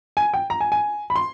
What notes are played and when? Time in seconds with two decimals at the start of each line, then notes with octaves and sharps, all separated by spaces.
0.17 G#5
0.34 G5
0.50 A#5
0.61 G#5
0.72 G#5
1.10 B5
1.16 C6